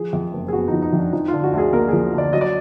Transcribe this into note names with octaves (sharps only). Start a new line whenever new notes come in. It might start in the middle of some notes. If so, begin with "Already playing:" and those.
Already playing: F3 G#4
F2
F#1
G#4
B3 F#4
F3 D#4
D#4
F2 D4
F3 D#4
F4
D3
F#4
D2 G#4
A#3 A#4
F3 G#4
D3 D5
F#3 D#5
D5